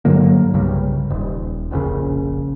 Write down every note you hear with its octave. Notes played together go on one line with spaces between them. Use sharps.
G2 D3 F#3 A#3
B1 G2 C#3 G3
D#1
F1 A#1 C#3